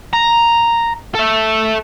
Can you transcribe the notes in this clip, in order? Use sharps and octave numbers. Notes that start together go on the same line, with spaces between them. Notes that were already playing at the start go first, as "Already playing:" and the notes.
A#5
A4 E5